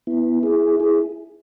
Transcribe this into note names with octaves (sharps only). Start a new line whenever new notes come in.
B3 E4
E4 G#4
E4 G#4